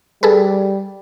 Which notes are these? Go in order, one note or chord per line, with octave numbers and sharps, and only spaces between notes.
G3 G#4 A4 B4